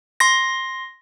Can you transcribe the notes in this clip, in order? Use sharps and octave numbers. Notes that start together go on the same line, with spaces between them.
C6 A#6